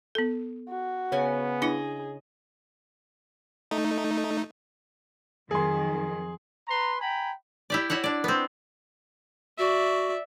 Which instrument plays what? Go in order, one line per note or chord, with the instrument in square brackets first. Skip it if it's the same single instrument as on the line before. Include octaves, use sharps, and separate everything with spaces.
[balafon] B3 A4
[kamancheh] F#4
[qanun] C#3 C#4 G#5 [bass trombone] B3
[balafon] D4 E4 [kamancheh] G#4 [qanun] D#5
[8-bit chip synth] A3 D#4
[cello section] F2 D#3 F#3 [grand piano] G#4 C6
[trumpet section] B4 A#5 C6
G5 G#5 A#5 B5
[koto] E4 G4 D5
E4 F#4 C#5 F#5
D4 D5
B3 C4
[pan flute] F#4 [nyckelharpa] D5 E5